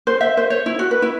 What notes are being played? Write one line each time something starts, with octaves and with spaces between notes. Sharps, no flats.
C5
E5
C5
C#5
E4
F#4
B4
E4